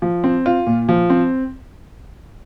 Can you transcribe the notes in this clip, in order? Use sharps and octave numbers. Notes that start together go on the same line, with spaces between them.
F3
C4
F4
A#2
F3
C4